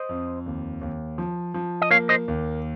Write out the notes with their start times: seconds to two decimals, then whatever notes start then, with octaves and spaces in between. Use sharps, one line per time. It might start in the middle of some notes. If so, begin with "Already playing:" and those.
Already playing: C5 D#5
0.09 F2
0.46 D#2
0.81 D#2
1.18 F3
1.54 F3
1.82 D#5
1.90 A#3 C#5 F5
2.09 C5 D#5
2.28 D#2